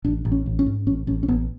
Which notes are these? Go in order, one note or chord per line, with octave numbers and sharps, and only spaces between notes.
A1 D4
A1
C#4
A1
C#4
G#2
A1 C#4
A1 C#4
C#4
A1 B3